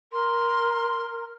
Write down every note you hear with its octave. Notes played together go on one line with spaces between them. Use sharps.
A#4 C6